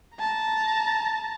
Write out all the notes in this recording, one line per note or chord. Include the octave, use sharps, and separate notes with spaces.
A5 A#5